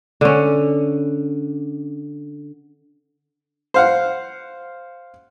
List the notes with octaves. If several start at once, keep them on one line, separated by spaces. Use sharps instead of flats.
D3 C#4
C5 F5 F#5